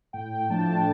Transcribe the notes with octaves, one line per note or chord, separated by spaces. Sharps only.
A2 G5
F3 A3 D4 A5